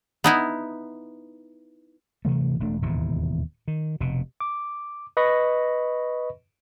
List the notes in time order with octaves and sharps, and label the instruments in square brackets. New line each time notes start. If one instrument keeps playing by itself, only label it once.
[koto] B3 D#4 E4
[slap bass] G2 C3 E3 A3
E1 G2 A3 D4
E1 D#2 A2 C3
D#3
F1 B2
[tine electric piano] D6
B4 D#5 B5 C#6 A#6